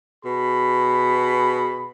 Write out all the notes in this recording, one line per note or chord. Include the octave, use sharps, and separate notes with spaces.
B2 G#4 B5